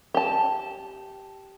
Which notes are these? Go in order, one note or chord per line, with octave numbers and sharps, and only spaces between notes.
G4 A5